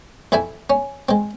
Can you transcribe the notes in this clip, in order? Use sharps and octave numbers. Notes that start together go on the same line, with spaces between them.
F2 C4 E4 E5 G#5
C#4
G#3 C4